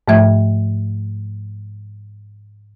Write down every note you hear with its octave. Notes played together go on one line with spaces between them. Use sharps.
G#2 F3 A3 E5 G#6